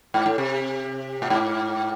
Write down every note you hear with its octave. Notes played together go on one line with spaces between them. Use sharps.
G#2
A2
C3
A2
G#2